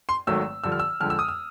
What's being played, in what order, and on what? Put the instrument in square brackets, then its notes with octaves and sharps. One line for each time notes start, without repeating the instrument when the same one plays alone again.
[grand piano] C6
G#1 G#2 D#3 F#3 A3 E6
G2 D3 F3 E6
F6
E6
F2 D3 F3 G#3 F6
E6
D#6
E6